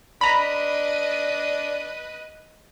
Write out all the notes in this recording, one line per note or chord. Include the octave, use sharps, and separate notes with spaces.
D4 B4 D#5 A#5 B5